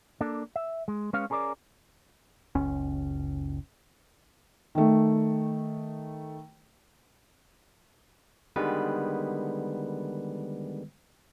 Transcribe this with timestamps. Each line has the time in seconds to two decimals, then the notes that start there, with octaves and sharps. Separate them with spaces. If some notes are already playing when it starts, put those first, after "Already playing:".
0.21 A#3 D4 A4
0.56 E5
0.88 G#3
1.13 G#3 C#4 B4 C#5 F5
1.30 C#4 G#4 A#4 C#5 D5
2.55 F#1 C#2 C#4
4.75 D#3 A3
8.56 D3 D#3 G3 G#3 B3 B4